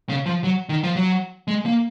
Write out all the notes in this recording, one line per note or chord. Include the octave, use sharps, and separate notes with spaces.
C#3
F3
F#3
D#3
F3
F#3
G#3
A#3